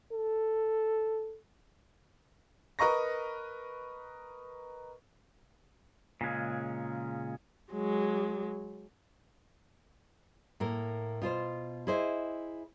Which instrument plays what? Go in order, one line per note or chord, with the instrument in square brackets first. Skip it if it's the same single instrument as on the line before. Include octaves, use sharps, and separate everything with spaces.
[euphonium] A4
[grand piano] A#4 B4 D#5 A#5 C#6 A#6
[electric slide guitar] A#2 C#3 G#3 C#4
[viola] F#3 G#3
[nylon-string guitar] A2 A#3 A#4
B2 F4 C5
E4 G#4 C5 D#5 E5